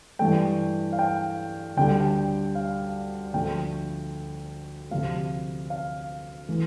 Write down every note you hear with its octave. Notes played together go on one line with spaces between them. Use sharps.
G2 E3 A3 G5
F5
G5
D2 D3 G3 G5
G5
F5
D2 D3 F3 A3 G5
D2 C3 F3 A3 F5
F5
E3 A3